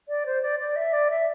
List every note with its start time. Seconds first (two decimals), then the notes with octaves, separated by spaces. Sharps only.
0.08 D5
0.26 C5
0.42 D5
0.59 D5
0.76 E5
0.93 D5
1.10 E5